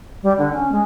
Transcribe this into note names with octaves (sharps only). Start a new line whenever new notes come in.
G3
D3
C#4
G#3